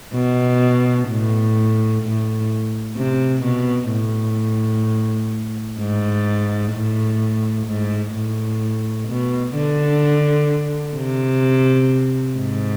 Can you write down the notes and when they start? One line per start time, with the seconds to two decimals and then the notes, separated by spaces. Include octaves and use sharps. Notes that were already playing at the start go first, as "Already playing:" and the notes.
0.14 B2
1.09 A2
2.02 A2
2.97 C3
3.43 B2
3.91 A2
5.79 G#2
6.73 A2
7.67 G#2
8.15 A2
9.08 B2
9.56 D3
10.96 C3
12.38 G#2